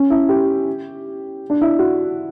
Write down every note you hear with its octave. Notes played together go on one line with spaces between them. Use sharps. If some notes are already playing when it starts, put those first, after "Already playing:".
Already playing: C#4
E4
G4
D4
E4
F#4